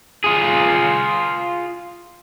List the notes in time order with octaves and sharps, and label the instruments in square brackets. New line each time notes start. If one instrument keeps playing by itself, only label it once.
[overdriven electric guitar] F4 G#4